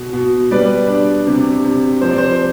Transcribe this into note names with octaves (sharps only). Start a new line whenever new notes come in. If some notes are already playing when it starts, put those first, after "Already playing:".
Already playing: B2
B2
G3 B4 D5
D4
C3
C3
F3 C5
D5
C5